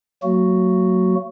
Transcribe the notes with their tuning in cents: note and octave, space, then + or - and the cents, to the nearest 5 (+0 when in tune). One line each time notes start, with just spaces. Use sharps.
F#3 +0 A#3 -35 F#4 +0